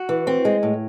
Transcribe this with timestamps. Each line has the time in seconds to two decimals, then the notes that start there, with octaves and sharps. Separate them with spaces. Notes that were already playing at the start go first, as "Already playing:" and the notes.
Already playing: F#4
0.09 E3
0.27 C4
0.45 G#3
0.63 A2